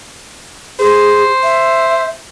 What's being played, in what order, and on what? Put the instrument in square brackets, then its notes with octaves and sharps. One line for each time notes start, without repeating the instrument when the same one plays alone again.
[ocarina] G#4 [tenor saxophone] C5
[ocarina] E5